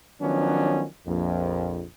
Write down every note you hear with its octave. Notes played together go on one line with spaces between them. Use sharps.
D#3 F3 F#3 B3 C#4 D4
A#1 F2